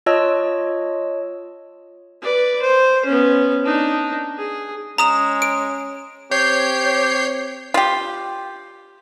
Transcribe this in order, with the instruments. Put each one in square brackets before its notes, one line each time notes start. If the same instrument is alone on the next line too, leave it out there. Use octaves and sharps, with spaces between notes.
[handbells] F4 C#5 D#5 A5 E6
[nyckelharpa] B4 D5
C5
B3 C#4
D4 D#4
G#4
[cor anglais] G#3 [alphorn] C#4 [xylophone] A#5 D#6 E7
[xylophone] D7
[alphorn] C4 [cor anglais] G4 [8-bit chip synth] C#5 G6 C7
[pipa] F4 G4